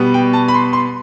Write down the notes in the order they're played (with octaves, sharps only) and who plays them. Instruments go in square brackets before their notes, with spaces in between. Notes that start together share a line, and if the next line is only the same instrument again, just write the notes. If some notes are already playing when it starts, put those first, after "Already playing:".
Already playing: [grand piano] B2 G3 B3
G5
A5
B5
C6
C6